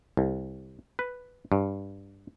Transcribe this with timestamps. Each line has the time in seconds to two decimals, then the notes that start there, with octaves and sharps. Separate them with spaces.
0.17 C2
0.99 B4
1.52 G2